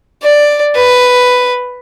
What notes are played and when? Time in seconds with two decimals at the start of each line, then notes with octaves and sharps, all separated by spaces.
0.23 D5
0.75 B4